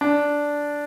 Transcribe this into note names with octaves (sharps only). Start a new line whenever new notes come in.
D4